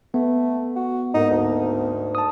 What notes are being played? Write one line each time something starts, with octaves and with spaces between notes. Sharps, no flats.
A3 B3
F#4
G#2 A#3 D#4
D2
A5 D#6